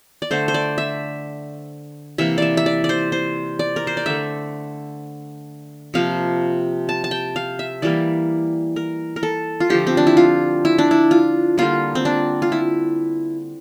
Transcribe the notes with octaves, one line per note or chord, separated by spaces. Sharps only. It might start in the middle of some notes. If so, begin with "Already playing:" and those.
D5
D3 A3 C5
C5
D5
E5
C3 E3 A#3 E5
D5 E5
E5
D5
D5
C5
C5
D5
A#4
C5
D5
D3 A3 E5
C3 F3 A#3 F5
A5
A5
G5
F5
E5
E3 G3 A#3 D5
A#4
A#4
A4
F4
D3 F3 A3 G4
C4
D4
E4
F4
E4
D4
E4
F4
D3 G3 A#3 F4
C4
D4
F4
E4